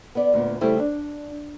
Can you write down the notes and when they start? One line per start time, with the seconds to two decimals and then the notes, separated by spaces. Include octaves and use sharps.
0.15 B3 D5
0.34 D2 A#2 B3
0.61 C#3 G3 A3 E4 G4 C5
0.79 D4